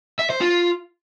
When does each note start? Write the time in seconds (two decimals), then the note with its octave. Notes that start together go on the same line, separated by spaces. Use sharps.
0.19 E5
0.30 C5
0.41 F4